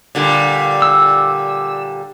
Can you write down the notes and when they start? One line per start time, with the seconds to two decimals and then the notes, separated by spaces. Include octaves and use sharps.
0.15 A#2 D3 G3
0.82 E6